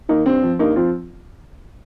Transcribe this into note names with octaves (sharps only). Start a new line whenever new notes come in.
D#3 A#3 D#4
G2 C4
F3
G2 A#3 D#4
F3 C4 F4